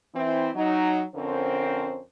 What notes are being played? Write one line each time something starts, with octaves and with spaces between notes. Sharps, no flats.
E3 C4 E4
F#3 D#4
F2 D3 C4 C#4 A#4 C5